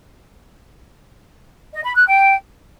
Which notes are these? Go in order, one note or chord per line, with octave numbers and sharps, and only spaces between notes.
D#5
B5
F#6
G5